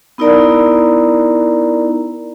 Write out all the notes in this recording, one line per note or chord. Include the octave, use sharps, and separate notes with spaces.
B3 D#4 E4 A#4 D5 A#5